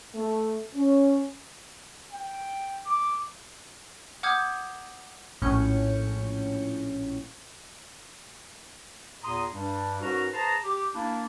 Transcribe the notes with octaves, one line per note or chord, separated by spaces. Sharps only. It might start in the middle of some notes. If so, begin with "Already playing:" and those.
A3
C#4
G5
D6
F#5 D6 D#6 F6 G6 G#6
A#1 A2 C#4 G6 C#7
E2 A#2 A#5 C6 D#6
G2 G3 D4
G#2 C#4 F#4 A#4 B4 A#5
G#4 B4 C5 A5 A#5
G4
A#3 D4 E4